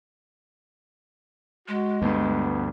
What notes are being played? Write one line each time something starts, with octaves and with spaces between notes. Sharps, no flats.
G#3 F#4
D2 G2 B3